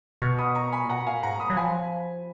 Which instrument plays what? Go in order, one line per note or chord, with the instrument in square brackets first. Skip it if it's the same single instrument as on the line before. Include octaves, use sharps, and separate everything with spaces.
[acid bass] B2 [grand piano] C#6 F6
[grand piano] B5 D#6
A#5 C#6
G#5 B5
[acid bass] A#2
[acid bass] B2 [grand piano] F#5 A#5
[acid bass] A#2 [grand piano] F5 G#5
[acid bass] G#2 [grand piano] F#5 A#5
[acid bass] A#2 [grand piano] B5 D#6
[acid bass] F#3
[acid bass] F3 [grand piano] G#5 B5